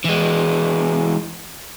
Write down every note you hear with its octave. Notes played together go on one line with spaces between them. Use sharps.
E3 G#3